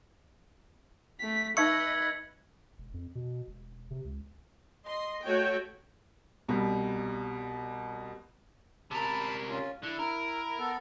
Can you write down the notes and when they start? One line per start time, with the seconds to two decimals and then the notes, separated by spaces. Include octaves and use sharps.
1.20 A3 B6
1.57 D#4 B4 D#5 E5 C#6 E6 G#6 C#7
2.78 E1
2.94 F2
3.15 B2
3.47 E1
3.91 C3
4.05 C#2
4.86 D#5 C6
5.24 A3 F#4 C#5 G5
6.48 C2 B2 G3
8.91 C3 A#4 A5 B5
9.49 C#4 F4
9.83 D3 E4
9.99 A#4
10.58 B3 A4